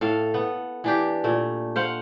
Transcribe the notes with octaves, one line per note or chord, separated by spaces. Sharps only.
A2 A4 F5
B3
E3 D4 G4
A#2 A3
C5 F5 F#5